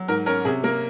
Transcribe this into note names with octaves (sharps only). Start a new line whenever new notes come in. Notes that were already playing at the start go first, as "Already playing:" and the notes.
Already playing: F#3
G#2 A#4
C#4 A#4
C3 G#4
A#3 A#4